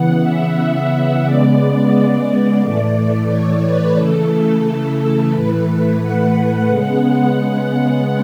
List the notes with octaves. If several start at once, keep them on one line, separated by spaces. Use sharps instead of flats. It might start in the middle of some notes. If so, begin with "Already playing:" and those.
Already playing: C#3 E3 B3 F#5
E5
E5
C#3 G#3 B3 D5
A2 E3 A3 D5
C#5
B4
C#3 E3 A3 A4
A2 E3 A3 B4
F#5
C#3 G#3 B3 F#5